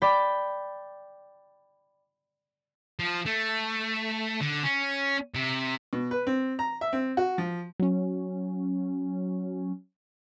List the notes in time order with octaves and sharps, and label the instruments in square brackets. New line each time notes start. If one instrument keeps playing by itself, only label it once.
[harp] D5 G5 B5 D6
[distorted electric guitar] F3
A3
D3
C#4
C3
[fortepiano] B2
B4
C4
A#5
E5
C4
F#4
F3
[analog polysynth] F#3 C#4